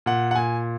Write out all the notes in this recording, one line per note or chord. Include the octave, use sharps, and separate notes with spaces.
A#2 F#5
F#5
A#2 G#5